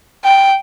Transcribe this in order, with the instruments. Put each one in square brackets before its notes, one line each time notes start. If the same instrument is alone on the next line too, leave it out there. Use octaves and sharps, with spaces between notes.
[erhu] G5